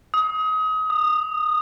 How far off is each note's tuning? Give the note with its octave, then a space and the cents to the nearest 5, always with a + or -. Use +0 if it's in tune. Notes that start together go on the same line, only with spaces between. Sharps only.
D#6 +30
D#6 -20